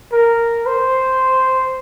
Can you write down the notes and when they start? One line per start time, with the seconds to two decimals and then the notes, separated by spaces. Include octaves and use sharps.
0.12 A#4
0.66 C5